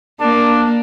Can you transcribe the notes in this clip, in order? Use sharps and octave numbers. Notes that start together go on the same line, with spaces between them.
A#3 D4